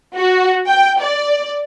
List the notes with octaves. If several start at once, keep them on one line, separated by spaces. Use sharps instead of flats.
F#4
G5
D5